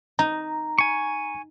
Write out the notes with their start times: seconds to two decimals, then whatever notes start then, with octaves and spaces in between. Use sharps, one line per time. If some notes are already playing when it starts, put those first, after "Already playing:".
0.19 D#4 A#5
0.78 G#5 C#6